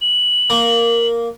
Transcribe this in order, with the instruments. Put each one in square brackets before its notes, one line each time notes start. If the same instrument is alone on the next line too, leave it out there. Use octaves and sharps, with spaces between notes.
[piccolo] F#7
[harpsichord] A#3